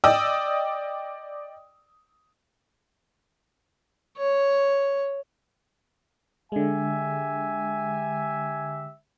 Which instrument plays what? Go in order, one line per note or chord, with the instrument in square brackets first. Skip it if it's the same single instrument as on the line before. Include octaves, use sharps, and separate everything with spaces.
[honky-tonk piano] D5 D#5 G5 D#6 E6
[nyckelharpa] C#5
[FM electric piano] D3 G#3 [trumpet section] G4 E5 [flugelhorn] G#5